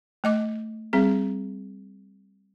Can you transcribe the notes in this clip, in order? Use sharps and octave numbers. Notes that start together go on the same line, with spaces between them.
A3 D#5 D6
G3 C4 G#4